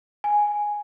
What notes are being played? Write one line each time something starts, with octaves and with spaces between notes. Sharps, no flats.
G#5